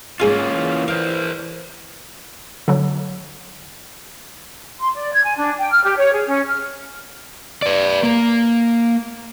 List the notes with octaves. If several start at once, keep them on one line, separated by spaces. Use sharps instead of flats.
G#2 A#3 C#4 F4 G#4 F5
E3
A#4 C5 F5
D3 F#3
C6
D5
G#6
G#5
D4
G5
F6
G4
C#5
G#4
C#4
F6
B4 D5
A#3